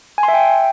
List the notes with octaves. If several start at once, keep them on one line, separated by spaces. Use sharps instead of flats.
G#5
C6
E5
G5